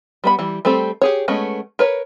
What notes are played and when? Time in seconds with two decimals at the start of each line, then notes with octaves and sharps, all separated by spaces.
0.24 G3 B3 B5
0.39 E3 G3
0.65 G3 A3 C4 A4
1.01 G4 G#4 C#5
1.28 G#3 A3 B3 C#4
1.79 A#4 B4 C#5